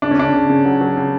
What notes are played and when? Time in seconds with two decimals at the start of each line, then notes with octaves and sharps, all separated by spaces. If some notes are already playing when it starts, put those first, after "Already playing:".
0.02 C#3 D4
0.11 C#4
0.18 C#3 D4
0.34 C#3
0.50 C#3
0.65 F#3
0.81 F#3
0.97 C#3